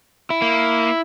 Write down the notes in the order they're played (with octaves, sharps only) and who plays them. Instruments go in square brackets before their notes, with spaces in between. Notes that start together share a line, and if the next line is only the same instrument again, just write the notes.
[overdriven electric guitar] E4
[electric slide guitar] A#3